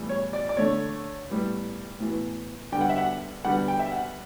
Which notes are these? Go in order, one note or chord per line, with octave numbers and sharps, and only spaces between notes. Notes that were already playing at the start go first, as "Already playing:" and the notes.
Already playing: A2 E3 G3 B3
C#5
D5
D5
D3 A3 C#5
A2 G3 B3
A2 E3 B3
D3 G3 B3 G5
F#5
E5
F#5
D3 G3 B3 F#5
G5
E5
F#5